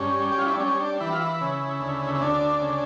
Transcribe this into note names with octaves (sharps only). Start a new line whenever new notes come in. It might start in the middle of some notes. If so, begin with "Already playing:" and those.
Already playing: G2 C#4
G3
G4
F4
E4
D4
G3 C#4
D4
E3 E4
F4
E4
C#3
D2
E4
D2 D4
C#3